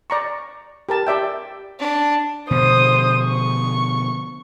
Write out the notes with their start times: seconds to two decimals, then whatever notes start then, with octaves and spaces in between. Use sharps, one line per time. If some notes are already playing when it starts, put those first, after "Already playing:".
0.10 D5 A#5 C#6
0.89 G4 A#4 A5
1.07 G4 D5 E5 G5
1.79 D4
2.51 B2 D3 F3 C5 D#6
3.26 C#6